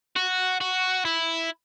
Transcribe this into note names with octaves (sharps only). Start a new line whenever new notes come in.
F#4
F#4
E4